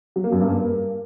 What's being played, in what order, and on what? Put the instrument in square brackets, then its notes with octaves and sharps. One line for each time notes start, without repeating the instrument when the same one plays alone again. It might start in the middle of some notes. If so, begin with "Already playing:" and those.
[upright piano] F#3
A#3
F#2
G2
A#3